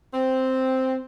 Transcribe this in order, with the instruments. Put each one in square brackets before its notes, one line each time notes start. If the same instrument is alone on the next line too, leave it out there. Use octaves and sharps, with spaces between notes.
[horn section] C4